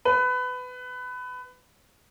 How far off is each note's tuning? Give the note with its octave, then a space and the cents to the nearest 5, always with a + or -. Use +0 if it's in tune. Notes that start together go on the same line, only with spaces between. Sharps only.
B4 +20